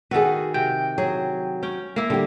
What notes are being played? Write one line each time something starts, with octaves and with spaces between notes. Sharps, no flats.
D#3 F#4 G#4 A4 B4
C3 G5
F#3 G#4
C#4 G5
A#3 E4
D3 G3 G4